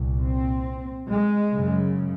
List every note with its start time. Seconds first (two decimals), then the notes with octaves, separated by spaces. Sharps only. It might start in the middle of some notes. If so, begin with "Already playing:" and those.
Already playing: C2 A#2
0.27 C4
1.12 G#3
1.54 F#2 C#3